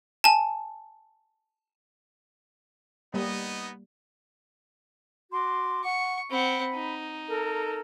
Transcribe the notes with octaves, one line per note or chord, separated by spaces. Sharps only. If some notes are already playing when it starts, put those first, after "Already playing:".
G#5 A5
G3 A#3 B3 D#4 D#5
F#4 C6 D6
F#5 C#6
C4 F#5 B5
D#4
A4 A#4